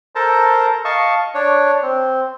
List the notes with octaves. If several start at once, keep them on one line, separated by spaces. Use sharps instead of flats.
A4 A#4 C5 A5 A#5
D#5 F5 A5 C#6
D4 C#5
C4